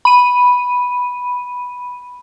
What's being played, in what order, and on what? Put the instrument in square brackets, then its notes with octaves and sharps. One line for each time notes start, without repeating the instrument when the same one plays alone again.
[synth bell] B5 D#7